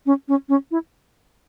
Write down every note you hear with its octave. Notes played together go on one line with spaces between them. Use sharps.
C#4
C#4
C#4
E4